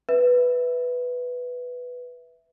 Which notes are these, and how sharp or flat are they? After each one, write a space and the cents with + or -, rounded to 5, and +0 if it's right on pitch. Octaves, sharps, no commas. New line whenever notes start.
B4 +0 E5 +0